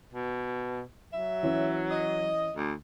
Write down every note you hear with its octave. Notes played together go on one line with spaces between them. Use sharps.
B2
F#3 E5
E3 C#4
D#5
D2